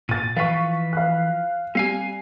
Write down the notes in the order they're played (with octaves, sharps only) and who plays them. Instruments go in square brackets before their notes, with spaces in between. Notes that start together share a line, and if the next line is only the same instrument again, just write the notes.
[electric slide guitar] A#2 [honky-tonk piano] A6 D#7
[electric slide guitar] E3 F3 B4 [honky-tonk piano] F5 C#6
[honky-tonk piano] F5 F#6
[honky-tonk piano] G3 [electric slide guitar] C4 F5 G#5